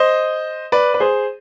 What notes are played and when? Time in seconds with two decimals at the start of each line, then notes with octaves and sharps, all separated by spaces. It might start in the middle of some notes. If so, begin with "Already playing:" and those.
Already playing: C5 D#5
0.72 B4 D5
0.94 B4
1.00 G#4 C5